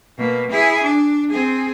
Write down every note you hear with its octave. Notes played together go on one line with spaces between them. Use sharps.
B2 A#3
E4 G#4
D4
C4 G#4